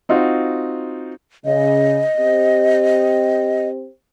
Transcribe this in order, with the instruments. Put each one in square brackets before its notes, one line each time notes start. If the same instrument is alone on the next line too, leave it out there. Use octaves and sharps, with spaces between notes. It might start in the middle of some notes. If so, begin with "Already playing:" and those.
[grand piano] C4 D#4 F4 F#4
[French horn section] C#3 [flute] D#5
[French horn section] C4 G4